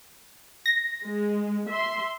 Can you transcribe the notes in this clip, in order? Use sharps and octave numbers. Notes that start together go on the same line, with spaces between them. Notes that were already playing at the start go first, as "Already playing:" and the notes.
A#6
G#3
E5 C6